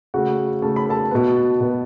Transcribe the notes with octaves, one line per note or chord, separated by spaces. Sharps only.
C#3 A3 F#4 F#5
C#3 A3 A5
B5
A4 A5
B2 B3
B2 B3